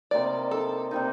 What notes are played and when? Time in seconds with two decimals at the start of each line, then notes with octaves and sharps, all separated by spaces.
0.11 C3 G3 A#3 D#4 D5
0.51 A4
0.91 C3 G3 A#3 D#4